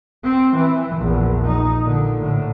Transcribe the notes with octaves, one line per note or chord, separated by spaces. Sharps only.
C4
E3
A#1 E2
D#4
A#2 D3
A2 D3